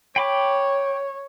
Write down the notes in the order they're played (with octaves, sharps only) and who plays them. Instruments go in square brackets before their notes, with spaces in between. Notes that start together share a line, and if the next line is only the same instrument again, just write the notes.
[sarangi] C#5 [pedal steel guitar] G5 B5 D6